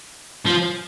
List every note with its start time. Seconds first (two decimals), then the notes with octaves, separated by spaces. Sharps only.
0.46 F3